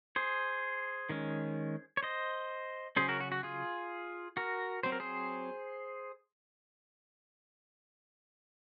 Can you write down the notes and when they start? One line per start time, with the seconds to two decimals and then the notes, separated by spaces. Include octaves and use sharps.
0.16 G#4 C5
1.09 D#3 G#3 C#4
1.97 C#5
2.03 C5 D#5
2.96 C#3 F#3 C#4 G#4 C5
3.08 F#4 A#4
3.20 F#4
3.32 F#4
3.43 F4 G#4
4.37 F#4 A#4
4.83 F#3 C4 C5
4.92 A#4
5.00 G#4 C5